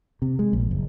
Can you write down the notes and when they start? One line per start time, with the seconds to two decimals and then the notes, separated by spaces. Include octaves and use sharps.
0.22 C3
0.39 G#3
0.53 A#1
0.71 F#1